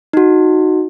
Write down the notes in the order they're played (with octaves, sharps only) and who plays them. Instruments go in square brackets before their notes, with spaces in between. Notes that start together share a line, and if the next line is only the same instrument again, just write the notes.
[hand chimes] D#4 F#4